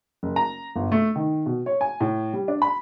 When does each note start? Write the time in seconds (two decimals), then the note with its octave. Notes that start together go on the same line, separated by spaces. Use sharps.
0.23 F#1
0.36 A#5
0.76 G1
0.92 A3
1.16 D#3
1.46 B2
1.66 C#5
1.81 G#5
2.00 A2
2.34 G3
2.48 D4
2.62 B5